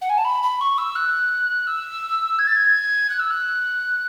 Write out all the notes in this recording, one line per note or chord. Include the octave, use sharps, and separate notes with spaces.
F#5
G#5
A5
B5
B5
C#6
E6
F#6
E6
G#6
A6
G#6
F#6
E6
F#6